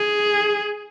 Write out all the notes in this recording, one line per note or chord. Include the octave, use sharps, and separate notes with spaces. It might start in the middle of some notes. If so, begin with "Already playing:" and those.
Already playing: G#4